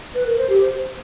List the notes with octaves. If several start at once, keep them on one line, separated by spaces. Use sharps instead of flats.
B4
A#4
C5
G4
C5